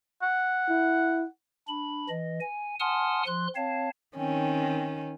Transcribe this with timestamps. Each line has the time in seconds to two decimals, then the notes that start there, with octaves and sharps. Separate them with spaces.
0.22 F#5
0.69 E4
1.68 D4 B5
2.09 E3 D#5
2.40 G#5
2.80 F#5 G#5 A5 C6 D#6 F6
3.27 F3 C6 F#6
3.56 C4 C#5 F5 A5
4.17 D#3 C4 C#4